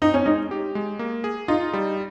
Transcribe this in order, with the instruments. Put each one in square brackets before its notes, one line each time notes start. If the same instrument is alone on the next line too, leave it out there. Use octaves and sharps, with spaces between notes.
[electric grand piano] C4 [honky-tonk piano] D#4
[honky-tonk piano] C#4
[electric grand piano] G#3 [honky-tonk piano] D#4
[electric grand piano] G4
G#3
A#3
G#4
[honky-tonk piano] D#4 [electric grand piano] F4
[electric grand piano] G3